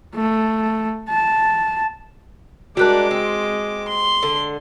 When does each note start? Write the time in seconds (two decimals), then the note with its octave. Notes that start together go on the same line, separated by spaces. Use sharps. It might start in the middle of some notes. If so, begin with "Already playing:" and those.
0.15 A3
1.09 A5
2.77 G3 G#3 A#3 D4 F#4 D6 F#6
3.11 C4
3.88 C6
4.23 D3